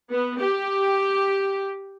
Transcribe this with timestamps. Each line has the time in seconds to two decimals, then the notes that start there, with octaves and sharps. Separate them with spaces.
0.11 B3
0.40 G4